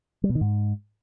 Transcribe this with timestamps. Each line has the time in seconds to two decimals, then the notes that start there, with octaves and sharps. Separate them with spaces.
0.24 G3
0.29 B2
0.35 D#3
0.41 G#2